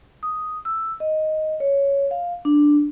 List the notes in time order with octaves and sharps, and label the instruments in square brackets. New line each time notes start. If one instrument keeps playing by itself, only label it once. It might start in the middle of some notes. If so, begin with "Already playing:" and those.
[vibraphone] D#6
E6
D#5
C#5
F5
D4